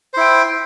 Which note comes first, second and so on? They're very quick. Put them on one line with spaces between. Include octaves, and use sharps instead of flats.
C5 E4 G5